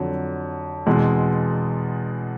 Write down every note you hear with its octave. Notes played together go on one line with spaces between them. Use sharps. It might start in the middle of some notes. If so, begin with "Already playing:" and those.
Already playing: F2 D3 F#3
E2 B2 G#3 C4